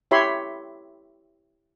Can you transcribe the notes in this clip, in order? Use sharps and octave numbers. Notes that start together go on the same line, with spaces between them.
E4 G4 C#5 E5 B5 C6